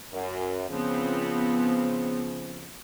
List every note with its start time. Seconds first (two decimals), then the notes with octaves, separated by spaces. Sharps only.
0.13 F#2
0.70 C#3 F3 B3 C4